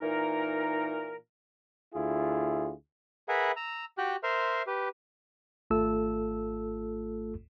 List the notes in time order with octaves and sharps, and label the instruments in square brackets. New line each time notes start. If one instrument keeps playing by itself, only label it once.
[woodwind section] A#2 E3 D#4 A#4
[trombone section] D2 E4 F4 G#4
[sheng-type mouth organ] G#4 A#4 B4 E5 F#5 B5
A#5 E6
F#4 G4 G5 F#6
A#4 C5 E5 C6 F6
G4 B4
[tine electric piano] G#1 A3 F4 A4 E6